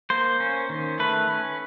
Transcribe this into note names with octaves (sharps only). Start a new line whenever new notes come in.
A#3 C5
C#4
D#3
A3 B4
C#4